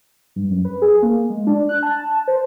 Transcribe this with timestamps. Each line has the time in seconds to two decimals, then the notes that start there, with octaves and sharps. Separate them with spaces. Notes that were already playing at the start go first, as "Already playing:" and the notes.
0.36 G2
0.50 F#2
0.65 B4
0.82 G#4
1.02 A#3
1.30 G#3
1.47 D4
1.69 F#6
1.83 A5
2.28 C5